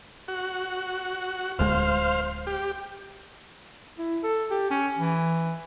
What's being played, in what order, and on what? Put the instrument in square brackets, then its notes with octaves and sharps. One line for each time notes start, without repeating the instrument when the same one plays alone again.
[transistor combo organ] F#4
[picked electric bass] D1 D2 G#3 [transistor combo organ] C5 F5
[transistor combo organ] G4
[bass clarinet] E4
A4
G4
C#4
E3